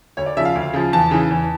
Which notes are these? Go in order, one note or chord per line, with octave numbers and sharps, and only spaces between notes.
D2 C#5
D5
C#3 F3 E5
F5
D2
C#3 F3
E2 A5
C#3 E3
E2